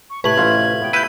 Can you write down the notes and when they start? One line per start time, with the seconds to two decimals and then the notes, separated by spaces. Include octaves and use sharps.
0.10 C#6
0.24 A2 C3 A3 B4 G#6 F#7
0.38 A1 E4 F4
0.82 B3 G5
0.93 E4 B4 G6 D#7